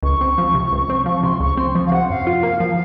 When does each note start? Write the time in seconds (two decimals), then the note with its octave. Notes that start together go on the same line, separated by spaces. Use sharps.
0.03 C#2 C#6
0.21 C4
0.38 F3
0.55 C3
0.72 C#2
0.90 C4
1.06 F3 C#6
1.23 C3 C6
1.40 C#2 C#6
1.57 C4 C6
1.75 F3
1.87 F5
1.92 C3 F#5
2.10 F#2 F5
2.27 F4
2.43 A#3
2.60 F3